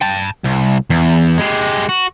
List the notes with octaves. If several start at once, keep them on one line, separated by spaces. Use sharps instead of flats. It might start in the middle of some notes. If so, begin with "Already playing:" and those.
G5 A5
C2
E2
G#3 G4
F#4